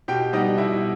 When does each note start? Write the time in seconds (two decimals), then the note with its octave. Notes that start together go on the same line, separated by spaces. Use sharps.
0.08 B2 G4 G5
0.33 G3 B3 D#4 D#5
0.58 B2 E4 E5